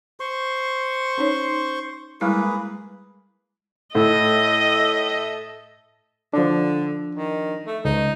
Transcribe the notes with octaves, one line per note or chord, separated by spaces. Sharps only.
C5 C6 C#6
C#4 D#4 C#5
G3 G#3 A#3 E4 G#4 B4
A2 A4 D#5 E5
D3 F3 D4
D#3
A3
C#2 D#4